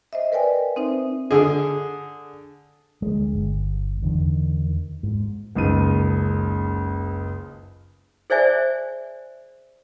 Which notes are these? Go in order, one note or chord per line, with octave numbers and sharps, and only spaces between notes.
C5 D#5 E5
A#4 B4 D5 G5 G#5
C4 D#4 C5 E5
D3 G#4
D2 G#3
G1
E2 D3 D#3
G#2
F#1 C#2 D#3 D#7
G#4 C5 D5 E5 G#5